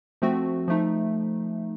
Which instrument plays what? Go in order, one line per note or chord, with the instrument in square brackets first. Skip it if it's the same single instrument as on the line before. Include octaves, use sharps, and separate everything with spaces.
[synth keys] F3 A3 C4 F#4
F3 A3 D#4